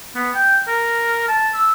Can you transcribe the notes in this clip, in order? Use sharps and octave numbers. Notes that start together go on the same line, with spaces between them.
B3
G5
A#4
A5
E6